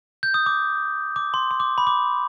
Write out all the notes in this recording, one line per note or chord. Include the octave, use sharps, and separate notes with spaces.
G6
D#6
D6
D6
C6
C6
D6
B5
D6